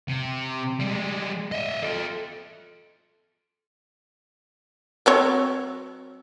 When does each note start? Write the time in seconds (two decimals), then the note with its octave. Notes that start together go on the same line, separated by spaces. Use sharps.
0.08 C3
0.80 G3 G#3
1.52 D#5 E5
1.83 A4 C5
5.06 F#3 C4 C#5